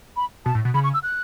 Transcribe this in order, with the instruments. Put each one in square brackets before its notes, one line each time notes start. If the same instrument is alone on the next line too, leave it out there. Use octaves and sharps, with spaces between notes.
[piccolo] B5
[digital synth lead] B2 [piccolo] A5
[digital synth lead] A2
B2
[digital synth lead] C#3 [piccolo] B5
[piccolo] C#6
E6
F#6